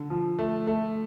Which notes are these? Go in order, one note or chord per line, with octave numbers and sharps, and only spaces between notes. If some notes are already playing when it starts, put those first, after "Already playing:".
Already playing: D3
F3
A3
A3